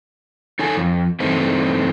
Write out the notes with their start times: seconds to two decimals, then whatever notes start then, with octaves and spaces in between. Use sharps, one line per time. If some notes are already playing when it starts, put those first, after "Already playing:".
0.59 D#4 A4 C#5 G#5
0.77 F2
1.20 G2 E3 A3 C4 D#4